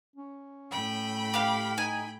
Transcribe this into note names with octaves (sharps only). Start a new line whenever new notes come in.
C#4
A2 G5 B5
G4 F5
D#4 G#5